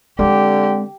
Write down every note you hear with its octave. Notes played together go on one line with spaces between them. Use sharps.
D3 G#3 C4 G4